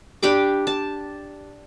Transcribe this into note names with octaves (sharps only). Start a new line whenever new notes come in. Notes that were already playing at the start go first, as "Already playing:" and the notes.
D4 G4 B5 D6
A5